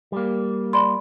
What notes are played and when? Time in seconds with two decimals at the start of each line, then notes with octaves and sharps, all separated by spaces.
0.12 G3 A#3
0.73 D5 B5 C6